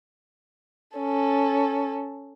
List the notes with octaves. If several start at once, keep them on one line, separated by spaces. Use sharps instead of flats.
C#4 A4